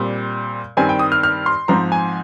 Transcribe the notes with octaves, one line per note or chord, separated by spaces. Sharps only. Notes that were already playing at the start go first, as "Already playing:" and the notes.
Already playing: A#2 G3 C4
G2 D#3 G3 C4 G#5
G5
D#6
F6
F6
C6
G#2 F3 C4 A#5
G#5